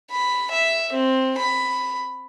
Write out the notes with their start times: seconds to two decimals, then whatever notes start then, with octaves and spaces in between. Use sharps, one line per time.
0.11 B5
0.51 E5
0.93 C4
1.38 B5